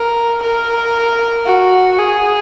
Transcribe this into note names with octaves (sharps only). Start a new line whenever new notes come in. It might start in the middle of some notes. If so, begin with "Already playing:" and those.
Already playing: A#4
A#4
F#4
G#4